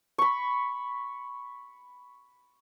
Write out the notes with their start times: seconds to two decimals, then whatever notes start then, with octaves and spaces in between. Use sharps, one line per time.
0.18 B5 C#6